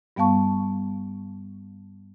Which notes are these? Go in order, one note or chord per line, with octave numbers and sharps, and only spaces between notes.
G2 G3 B3 F5 A5 C#6